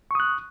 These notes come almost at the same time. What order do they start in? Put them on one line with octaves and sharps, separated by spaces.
C#6 D#6 F#6